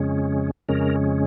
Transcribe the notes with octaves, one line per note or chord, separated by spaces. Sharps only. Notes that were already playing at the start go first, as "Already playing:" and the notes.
Already playing: F2 C#3 G#3 C#4
F2 C#3 G#3 C#4 A#4